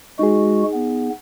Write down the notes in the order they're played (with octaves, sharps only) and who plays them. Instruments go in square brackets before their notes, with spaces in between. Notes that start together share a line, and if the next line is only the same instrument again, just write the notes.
[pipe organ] G#3 F#4 [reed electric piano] D#4 G#4
[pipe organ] B3